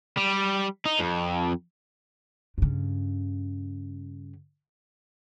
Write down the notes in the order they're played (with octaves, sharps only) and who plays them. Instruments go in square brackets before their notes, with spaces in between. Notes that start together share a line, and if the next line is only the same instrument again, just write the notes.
[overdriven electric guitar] G3
D#4
F2
[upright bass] G2 C#3